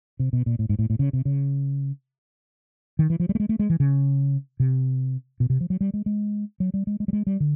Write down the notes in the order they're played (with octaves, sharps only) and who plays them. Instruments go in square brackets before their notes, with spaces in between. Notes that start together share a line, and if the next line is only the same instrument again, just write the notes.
[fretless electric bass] C3
B2
A#2
A2
G#2
A2
A2
C#3
C3
C#3
D#3
E3
F3
G3
A3
G#3
A3
G#3
E3
C#3
C3
B2
C3
F3
F#3
G3
G#3
G#3
F#3
G3
G#3
G#3
G3
G#3
G3
D3